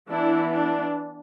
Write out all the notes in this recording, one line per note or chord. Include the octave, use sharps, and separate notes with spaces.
E3 B3 D4 E4
D4